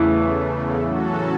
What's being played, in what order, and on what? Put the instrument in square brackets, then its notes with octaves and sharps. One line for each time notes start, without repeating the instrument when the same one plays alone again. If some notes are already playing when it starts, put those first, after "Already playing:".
Already playing: [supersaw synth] E2 C#3 A3 [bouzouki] E3
[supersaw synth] A2 F#3 C#4 F#4 A4